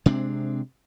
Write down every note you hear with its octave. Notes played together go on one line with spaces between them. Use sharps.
C3 G#3 C4 D4